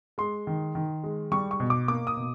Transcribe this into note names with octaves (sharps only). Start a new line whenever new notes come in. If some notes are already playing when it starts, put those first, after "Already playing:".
G#3 C6
D#3
D#3
G#3
G3 C#6
C#6
B2
D6
A#3 D6
D#6
B2